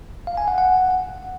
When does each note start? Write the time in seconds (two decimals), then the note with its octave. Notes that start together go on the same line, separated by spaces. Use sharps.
0.27 F5
0.37 G#5
0.48 F#5
0.58 F#5